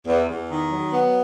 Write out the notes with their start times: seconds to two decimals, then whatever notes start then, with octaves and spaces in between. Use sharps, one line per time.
0.07 E2
0.28 E2
0.50 D#3
0.71 F#3
0.93 B3